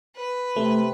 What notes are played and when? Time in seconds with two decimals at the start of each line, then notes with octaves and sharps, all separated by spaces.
0.16 B4
0.56 C3 A3